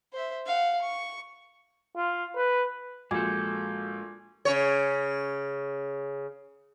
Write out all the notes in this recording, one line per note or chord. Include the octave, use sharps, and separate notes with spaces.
C5 E5
F5 F#5
C#6
F4
B4
A#1 G#3 F#4 A4 G#5 D6 G6 G#6
C#3 C#5